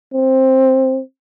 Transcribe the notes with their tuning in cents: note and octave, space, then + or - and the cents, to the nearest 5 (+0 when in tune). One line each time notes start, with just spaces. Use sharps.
C4 +10